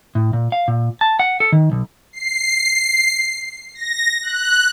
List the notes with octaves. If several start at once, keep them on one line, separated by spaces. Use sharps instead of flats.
A2
A#2
F5
A#2
A5
F#5
A4
D#3
B1
C7
A#6
F#6